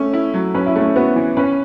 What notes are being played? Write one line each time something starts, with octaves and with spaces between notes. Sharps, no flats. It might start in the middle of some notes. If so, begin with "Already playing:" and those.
Already playing: A3 C#4
E4
F#3
C#4 B4
E4
A3 C#4
B3 F#4
E3
C#4 B4